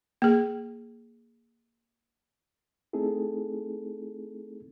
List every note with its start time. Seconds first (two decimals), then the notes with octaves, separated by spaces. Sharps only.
0.22 A#3 G#4
2.93 A3 C4 D#4 E4 G#4 A4